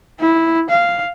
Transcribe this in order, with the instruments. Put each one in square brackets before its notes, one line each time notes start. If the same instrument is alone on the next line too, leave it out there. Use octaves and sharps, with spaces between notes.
[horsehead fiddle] E4
F5